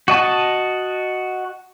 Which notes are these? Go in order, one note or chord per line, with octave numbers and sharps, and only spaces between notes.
F#4 D#5 A5